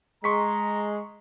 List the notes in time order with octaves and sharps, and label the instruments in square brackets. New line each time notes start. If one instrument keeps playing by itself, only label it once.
[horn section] G#3 [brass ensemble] A#5 [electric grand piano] C6 C#6 B6